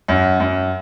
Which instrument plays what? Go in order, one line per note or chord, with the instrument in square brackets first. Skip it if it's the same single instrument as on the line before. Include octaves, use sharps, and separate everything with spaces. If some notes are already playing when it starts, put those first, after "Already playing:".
[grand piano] F#2
F#2